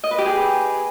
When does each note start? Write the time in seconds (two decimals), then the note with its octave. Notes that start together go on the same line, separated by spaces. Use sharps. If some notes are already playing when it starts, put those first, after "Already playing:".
0.04 D#5
0.11 B4
0.18 G4
0.26 G#4